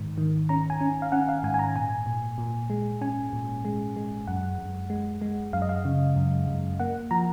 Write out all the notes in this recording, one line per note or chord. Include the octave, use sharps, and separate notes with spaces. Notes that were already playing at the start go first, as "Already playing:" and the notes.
Already playing: G#2 D#3
D#3
C#4 A#5
G#5
C#4
F5
C#4 F#5
F5
G#2 G#5
G#5
A#5
A#2 G#5
A#2
A#2
G#3
C#4 G#5
A#2
G#3
G#3
F#2 F#5
F#2
G#3
G#3
F#2 F5
D#5
F5
C#3
F#2
F#2
A#3 F#5
F3 A#5